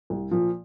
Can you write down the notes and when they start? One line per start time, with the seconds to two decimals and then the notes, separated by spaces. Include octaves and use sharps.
0.10 C2
0.31 A#2 F3